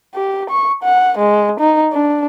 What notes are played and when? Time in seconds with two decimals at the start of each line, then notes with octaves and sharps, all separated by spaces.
0.15 G4
0.50 C#6
0.83 F#5
1.18 G#3
1.60 D#4
1.93 D4